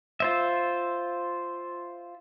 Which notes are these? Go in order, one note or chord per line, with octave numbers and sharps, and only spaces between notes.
F4 C5 E5